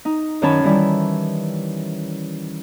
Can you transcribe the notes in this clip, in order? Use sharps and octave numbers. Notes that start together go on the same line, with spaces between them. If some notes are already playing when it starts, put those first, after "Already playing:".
D#4
F#2 D#3 C#4 C#5 A5 B5
D#3 E3 G3 E4